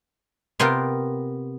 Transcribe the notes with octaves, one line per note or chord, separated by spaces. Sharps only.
C3 B3 F4 A#4 G5